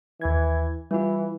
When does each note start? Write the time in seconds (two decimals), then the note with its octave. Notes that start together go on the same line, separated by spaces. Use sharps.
0.21 D#2 E3 G#6
0.91 E3 G3 F4